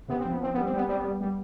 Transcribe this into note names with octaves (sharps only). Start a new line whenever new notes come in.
C3 B3
C4
F3
B3
F3 C4
G3 B3
C4
G3 B3
G3 C4
B3
G3
G3